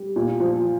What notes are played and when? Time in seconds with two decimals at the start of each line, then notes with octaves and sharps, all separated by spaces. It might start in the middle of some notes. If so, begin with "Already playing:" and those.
Already playing: G3
0.16 A#2
0.40 F3